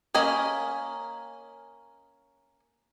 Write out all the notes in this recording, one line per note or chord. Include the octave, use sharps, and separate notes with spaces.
A#3 C#4 D#5 G#5 B5